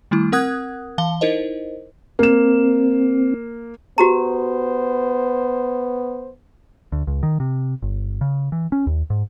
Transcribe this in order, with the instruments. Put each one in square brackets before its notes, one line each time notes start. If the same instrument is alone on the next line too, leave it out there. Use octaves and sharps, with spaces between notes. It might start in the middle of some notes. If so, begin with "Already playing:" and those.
[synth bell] D#3 G3 A3 E4
C4 A#4 F#5 D#6 F#6 G#6
E3 F5 A5 G7
D#4 E4 A#4 C5 D#5
[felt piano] A#3 E7 [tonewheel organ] C4
[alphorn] B3 [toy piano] F#4 G4 A#5 [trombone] C5
[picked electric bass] D2
C#2
D#3
C3
G1
C#3
E3
C#4
D#2
G#2